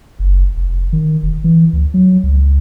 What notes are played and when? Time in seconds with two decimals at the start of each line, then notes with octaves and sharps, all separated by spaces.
0.19 F#1
0.57 F1
0.93 D#3
1.23 E1
1.44 E3
1.73 D2
1.94 F#3
2.23 C#2